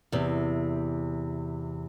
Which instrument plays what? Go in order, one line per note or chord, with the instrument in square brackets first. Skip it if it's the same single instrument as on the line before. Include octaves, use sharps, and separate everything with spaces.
[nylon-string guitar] E2 C3